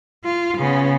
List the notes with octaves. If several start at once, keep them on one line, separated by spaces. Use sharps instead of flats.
F4
C#3 B3